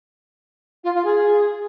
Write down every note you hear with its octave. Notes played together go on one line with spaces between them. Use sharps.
F4
F4
G#4